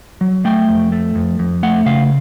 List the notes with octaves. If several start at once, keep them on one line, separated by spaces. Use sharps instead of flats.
F#3
A3 G5
F2
A3
F2
F2
A3 F#5
C#3 F5